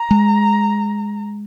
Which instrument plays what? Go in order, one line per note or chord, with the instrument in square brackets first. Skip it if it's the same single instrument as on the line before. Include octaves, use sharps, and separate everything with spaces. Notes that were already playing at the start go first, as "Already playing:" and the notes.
Already playing: [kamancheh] A#5
[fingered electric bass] G#3